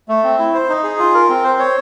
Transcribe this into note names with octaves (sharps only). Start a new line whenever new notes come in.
A3
C4
E4
C5
D#4
G#4
F4
A#4
C4
C5
C#5